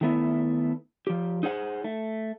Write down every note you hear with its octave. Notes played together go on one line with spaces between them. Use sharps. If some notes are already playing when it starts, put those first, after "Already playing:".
D#3 A3 B3 E4
F3 G4
D#4 G#4 C5 F#5
A3